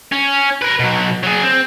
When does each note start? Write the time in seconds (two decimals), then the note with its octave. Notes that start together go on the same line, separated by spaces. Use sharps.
0.12 C#4
0.62 A#4 B4
0.80 B2 F#3
1.23 F#3 G#4
1.43 C4